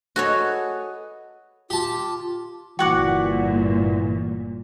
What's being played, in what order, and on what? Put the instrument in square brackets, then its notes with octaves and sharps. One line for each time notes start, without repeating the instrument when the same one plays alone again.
[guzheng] F#4 A4 C#5 [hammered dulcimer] G#4 B4 D#5
[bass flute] F4 [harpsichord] G4 A5
[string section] G1 A#2 [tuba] E3 [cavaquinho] F#4 F#5 D6